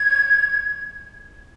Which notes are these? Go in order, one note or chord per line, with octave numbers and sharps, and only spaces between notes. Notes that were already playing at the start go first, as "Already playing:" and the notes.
Already playing: G#6